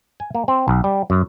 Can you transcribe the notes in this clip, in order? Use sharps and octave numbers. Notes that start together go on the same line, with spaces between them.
G#5
A#3
C4
B1
G3
F#2